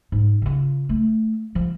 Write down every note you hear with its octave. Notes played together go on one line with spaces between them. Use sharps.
G#2
C#3 F4
A3
F3